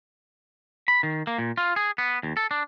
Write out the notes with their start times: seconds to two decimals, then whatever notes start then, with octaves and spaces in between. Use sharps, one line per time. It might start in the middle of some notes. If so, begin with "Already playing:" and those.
0.88 B5
1.03 D#3
1.27 A#3
1.38 A#2
1.58 F4
1.76 G#4
1.98 B3
2.23 D#2
2.37 A4
2.51 D4